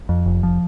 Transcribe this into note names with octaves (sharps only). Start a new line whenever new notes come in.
F2
F1
F3